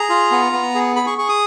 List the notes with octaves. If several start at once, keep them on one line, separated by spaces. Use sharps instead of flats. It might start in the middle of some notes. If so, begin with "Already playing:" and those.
Already playing: G#4 A#5
F4
B3
B3
G#4
G#4 B5
C#6
G#4 C#6
D#6